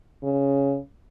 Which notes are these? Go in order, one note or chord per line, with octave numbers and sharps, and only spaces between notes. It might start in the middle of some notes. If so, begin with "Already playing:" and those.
C#3